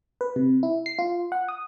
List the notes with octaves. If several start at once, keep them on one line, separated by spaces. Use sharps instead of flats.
B4
C3
E4
C7
F4
F#5
D#6